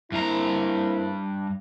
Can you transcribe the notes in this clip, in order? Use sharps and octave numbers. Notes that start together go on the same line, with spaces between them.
G2 A#3 C4 E4 A#5